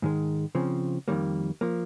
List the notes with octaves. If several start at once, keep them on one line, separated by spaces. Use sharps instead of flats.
G#2 D#3 G#3
C#3 F3 C4
F2 D#3 G3 A#3
F3 A#3